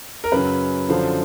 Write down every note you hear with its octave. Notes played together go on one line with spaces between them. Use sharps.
A#4
F#2 C#3 F#3 B4
F#2 D3 F3 C5